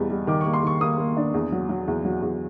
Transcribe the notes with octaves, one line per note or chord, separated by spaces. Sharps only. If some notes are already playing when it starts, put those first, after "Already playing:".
Already playing: E2 B2 G3
G3
D#3 D6
A#3 C#6
C6
D#3 C#6
A#3 D#6
A#3
D4
E2
F#3
F#3
E2
F#3
E2